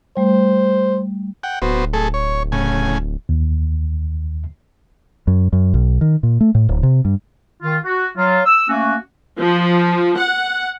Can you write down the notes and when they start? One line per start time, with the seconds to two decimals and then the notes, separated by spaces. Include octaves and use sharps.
0.17 G3 A3 C5
1.43 F#5 G5
1.62 D1 B3 F#4 C5
1.93 A3 G#4 A4
2.14 C#5
2.52 A2 C#3 G#5
3.29 D#2
5.27 F#2
5.53 F#2
5.74 B1
6.01 D#3
6.23 A#2
6.41 A3
6.55 A2
6.69 D1
6.83 C3
7.05 G2
7.63 D#3 F4
7.85 F#4
8.17 F#3 F4
8.46 E6
8.69 A3 A#3 C#4 F#4
9.40 F3
10.16 F#5